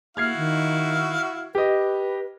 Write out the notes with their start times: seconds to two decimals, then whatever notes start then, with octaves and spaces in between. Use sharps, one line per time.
0.17 A#3 E4 F#4 F5 F6 G#6 C7
0.37 D#3
1.55 G4 B4 D#5